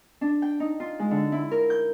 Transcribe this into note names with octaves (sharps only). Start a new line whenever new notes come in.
D4
G5
D#4
F4
G#3
D3
E4
A#4
G6